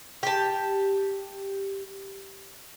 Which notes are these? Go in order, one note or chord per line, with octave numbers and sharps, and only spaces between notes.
G4 A5